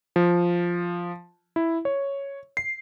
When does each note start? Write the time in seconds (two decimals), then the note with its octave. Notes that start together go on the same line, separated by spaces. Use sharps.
0.16 F3
1.56 E4
1.85 C#5
2.57 C7